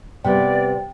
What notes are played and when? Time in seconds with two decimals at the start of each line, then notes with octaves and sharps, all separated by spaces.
0.25 C3 G3 B3 D5 G5